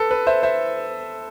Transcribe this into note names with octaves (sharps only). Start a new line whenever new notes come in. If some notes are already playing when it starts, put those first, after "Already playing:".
Already playing: A4 B4
B4
C5 E5
C5 E5